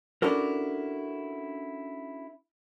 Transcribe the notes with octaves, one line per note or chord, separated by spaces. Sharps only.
C#4 D4 E4 F#4 A4 A#4